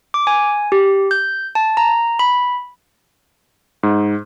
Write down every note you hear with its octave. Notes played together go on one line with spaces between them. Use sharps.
D6
G#5
G4
G6
A5
A#5
B5
G#2